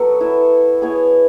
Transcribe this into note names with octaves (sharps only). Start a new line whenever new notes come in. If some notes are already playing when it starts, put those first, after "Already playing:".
Already playing: F#3 B3 F#4 A4
E4 B4 E5
B3 E4 G#4 C#5